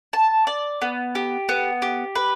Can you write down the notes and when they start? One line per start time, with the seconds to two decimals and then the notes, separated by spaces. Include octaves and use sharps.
0.13 A5
0.47 D5
0.82 B3
1.15 G4
1.49 B3
1.82 G4
2.15 B4